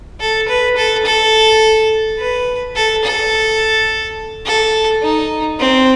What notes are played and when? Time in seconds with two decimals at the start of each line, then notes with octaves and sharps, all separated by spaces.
0.20 A4
0.48 B4
0.76 A4
1.05 A4
2.19 B4
2.75 A4
3.04 A4
4.46 A4
5.03 D#4
5.60 C4